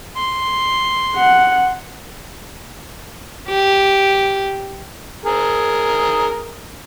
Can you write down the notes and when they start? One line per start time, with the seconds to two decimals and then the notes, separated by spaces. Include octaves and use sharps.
0.16 C6
1.16 F#5
3.49 G4
5.25 G#4 A#4